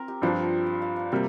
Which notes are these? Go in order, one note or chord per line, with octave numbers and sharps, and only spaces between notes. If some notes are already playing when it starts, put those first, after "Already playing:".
Already playing: C4 A#4
G4
G2 F3 D4 F4
C5
F5
F5
C3 G3 A#3 D5